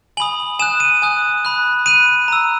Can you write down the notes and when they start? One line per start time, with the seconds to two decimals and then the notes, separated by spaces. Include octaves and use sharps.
0.17 G#5 B5 D#6 F#7
0.59 G#5 D#6 F#6 E7
0.80 D#7
1.02 G#5 D#6 F#6
1.45 B5 F#6
1.86 B5 F#6 D#7
2.28 A#5 E6